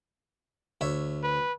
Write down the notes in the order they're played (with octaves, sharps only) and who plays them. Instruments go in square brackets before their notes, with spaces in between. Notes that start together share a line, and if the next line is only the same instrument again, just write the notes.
[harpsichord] D2 C#5 E5
[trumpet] B4